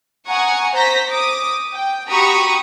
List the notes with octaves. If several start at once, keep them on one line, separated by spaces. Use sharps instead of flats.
F#5 G#5 A#5 C#6 D#6
C5 A#5 G6 A#6 B6
D6 D#6
G5
F#4 G4 A#5 B5 C#6 D#6